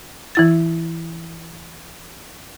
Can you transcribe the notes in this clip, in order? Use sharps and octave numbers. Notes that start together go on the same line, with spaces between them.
E3 E4 A6